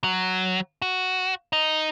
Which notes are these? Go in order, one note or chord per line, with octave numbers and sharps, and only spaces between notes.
F#3
F#4
D#4